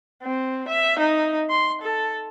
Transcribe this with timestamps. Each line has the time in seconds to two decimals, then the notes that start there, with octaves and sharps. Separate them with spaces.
0.23 C4
0.68 E5
0.99 D#4
1.50 C6
1.82 A4